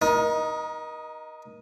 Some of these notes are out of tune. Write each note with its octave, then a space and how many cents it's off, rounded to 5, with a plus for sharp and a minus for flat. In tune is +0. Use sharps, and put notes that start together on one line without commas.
D#4 +0 A#4 +35